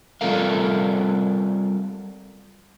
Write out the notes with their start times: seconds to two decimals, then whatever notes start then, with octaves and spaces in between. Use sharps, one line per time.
0.21 G3 C4 F4 A4 A#4 F5